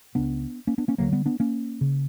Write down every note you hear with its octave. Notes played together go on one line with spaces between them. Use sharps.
C#2 C#3 B3 D4
A#3 C#4
B3 D4
A#3 C#4
D2 D3 F#3 A#3
G3 B3
B3 D4
A#3 C#4
C#3